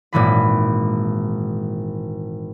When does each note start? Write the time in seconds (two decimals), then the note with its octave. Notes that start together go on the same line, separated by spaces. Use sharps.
0.13 G#1 A#2 E3 B5